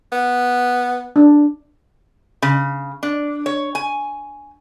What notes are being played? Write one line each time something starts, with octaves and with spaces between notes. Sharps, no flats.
B3
D4
C#3
D4
C#5
G#5